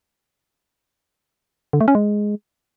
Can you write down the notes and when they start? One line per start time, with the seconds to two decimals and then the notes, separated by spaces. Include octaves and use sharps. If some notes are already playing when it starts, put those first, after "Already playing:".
1.73 D3
1.81 A3
1.88 C#4
1.95 G#3